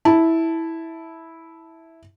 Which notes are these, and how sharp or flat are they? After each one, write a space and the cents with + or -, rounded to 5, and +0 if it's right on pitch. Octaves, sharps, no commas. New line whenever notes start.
E4 -10 A5 +0